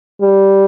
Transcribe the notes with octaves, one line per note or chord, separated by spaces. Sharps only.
G3